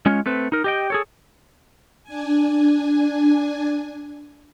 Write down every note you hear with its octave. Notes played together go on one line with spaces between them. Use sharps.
G#3 C#4 F4 C#5
A3 C4 B4
D#4 A#4
G4 D#5 G5
G#4 A4 C#5
D4 G#5